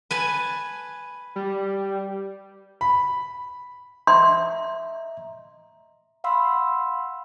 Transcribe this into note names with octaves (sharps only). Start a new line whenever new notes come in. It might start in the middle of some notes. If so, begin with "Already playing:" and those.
B4 G#5 A5
G3
B5
D#5 E5 A#5 C6
F5 F#5 B5 C6 E6